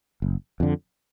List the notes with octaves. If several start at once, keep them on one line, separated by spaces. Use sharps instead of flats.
F#1
F2 D3